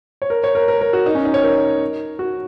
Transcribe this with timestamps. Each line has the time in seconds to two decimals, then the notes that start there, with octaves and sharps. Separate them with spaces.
0.22 C#5
0.30 A#4
0.44 C#5
0.55 A#4
0.68 A#4
0.81 A#4
0.93 F#4
1.06 D#4
1.15 C#4
1.25 D#4
1.34 C#5
1.43 A#4
2.19 F#4